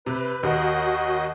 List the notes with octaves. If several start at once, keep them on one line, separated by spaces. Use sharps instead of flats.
C3 B4
D#2 F#4 D#5